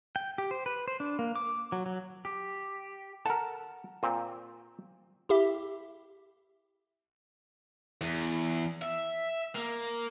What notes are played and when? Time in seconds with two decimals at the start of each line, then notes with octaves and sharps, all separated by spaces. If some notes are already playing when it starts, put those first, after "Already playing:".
0.16 G5
0.38 G4
0.51 C5
0.66 B4
0.88 C5
1.00 D4
1.19 A#3
1.36 D6
1.72 F#3
1.86 F#3
2.25 G4
3.26 A4 A#4 F#5 A5
4.03 A#2 C4
5.29 E4 G4 E5
8.01 E2
8.82 E5
9.55 A#3